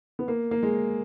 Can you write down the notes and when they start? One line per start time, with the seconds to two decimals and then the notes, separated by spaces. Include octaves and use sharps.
0.19 B3
0.28 A#3
0.51 A#3
0.63 G#3